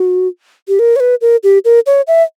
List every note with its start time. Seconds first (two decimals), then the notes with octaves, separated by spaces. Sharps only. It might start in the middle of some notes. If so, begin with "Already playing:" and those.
Already playing: F#4
0.68 G4
0.79 A#4
0.96 C#5
1.00 B4
1.21 A#4
1.44 G4
1.65 A#4
1.86 C#5
2.08 E5